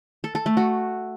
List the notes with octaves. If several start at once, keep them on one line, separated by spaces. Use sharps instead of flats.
A4
A4
A3
F#4